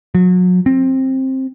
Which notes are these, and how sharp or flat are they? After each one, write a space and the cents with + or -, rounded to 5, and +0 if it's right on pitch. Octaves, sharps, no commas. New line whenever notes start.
F#3 -30
C4 +15